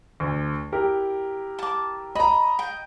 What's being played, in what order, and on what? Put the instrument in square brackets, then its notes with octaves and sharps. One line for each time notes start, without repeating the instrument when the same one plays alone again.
[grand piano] D2
E4 G4 A#4
[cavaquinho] A5 D6
[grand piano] D#5 A#5 [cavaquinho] B5
[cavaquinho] G5